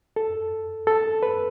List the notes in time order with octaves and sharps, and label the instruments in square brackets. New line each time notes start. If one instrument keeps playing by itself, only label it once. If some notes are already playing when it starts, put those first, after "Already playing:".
[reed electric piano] A4
A4
B4